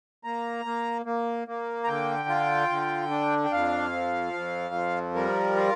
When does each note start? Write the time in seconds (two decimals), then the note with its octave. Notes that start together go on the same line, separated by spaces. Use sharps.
0.24 A#3 A#5
0.65 A#3
1.06 A#3
1.48 A#3
1.84 A#5
1.87 D3 G5
2.29 F4
2.70 D3
3.10 D4
3.45 G5
3.52 F2 F5
3.92 F3
4.33 F2
4.74 F3
5.15 G3 A#4
5.56 F4